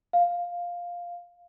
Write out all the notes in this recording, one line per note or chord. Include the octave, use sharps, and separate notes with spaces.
F5